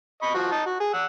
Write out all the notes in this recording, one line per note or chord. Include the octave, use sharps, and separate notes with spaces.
D#5 B5 C#6
F3 F#4
D#4 A5
F#4
G#4
F#5 E6